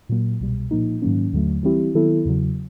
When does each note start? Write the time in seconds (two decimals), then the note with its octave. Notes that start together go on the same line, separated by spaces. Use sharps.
0.09 A#2 F#3 A#3
0.40 C2 B2 G3
0.71 A#2 F3 A#3 D#4
1.02 G#2 D#3 F#3 A#3 C#4
1.33 D#2 D3 F#3 A3
1.63 E3 G3 C4 E4 G4
1.95 D#3 F#3 B3 E4 A4
2.25 E2 C#3 F#3